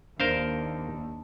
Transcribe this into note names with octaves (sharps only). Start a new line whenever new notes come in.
D#2 D4 A#4 C5 F5